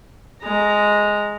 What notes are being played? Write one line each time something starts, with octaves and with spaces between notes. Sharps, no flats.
G#3 A#5